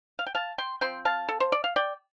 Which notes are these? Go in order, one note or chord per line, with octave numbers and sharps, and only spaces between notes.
F5
G5
F5 A5
G5 C6
F3 C4 G5 C6
F5 A5
A4
C5
D5
F5
D5 G5